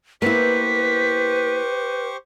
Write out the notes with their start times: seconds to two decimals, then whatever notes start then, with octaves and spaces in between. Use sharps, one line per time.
0.22 A#3 B3 E4 G4 B4 C5 C#6 B6